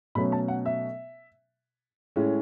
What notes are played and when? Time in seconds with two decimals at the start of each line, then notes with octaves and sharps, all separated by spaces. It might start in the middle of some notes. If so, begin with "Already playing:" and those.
0.15 B2 F#3 A3 C#4 B5
0.32 A5
0.48 F#5
0.66 E5
2.16 A2 G#3 C#4